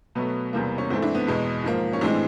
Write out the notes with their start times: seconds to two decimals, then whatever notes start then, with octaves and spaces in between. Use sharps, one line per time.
0.15 B2 F#3 A3 B3
0.53 E2 C3 E3 G3 A#3
0.78 C#4
0.90 G#2 E3 A3 C4
1.02 D4 E4
1.15 B3
1.27 E2 B2 G#3
1.64 G#2 F3 A#3
1.93 C#4
2.01 A2 E3 G#3 C4 D4